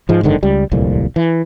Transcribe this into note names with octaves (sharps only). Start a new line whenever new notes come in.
G#2 F3 G#3
F#1 G#2 D3 D#3
C#2 G3
D1 C2 F2 A#2
E3